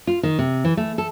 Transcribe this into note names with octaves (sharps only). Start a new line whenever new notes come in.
F4
D#3
C3
E3
A3
A4